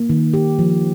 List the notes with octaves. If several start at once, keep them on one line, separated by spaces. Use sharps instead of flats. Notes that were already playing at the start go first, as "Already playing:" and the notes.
Already playing: A#3
D#3
G4
F3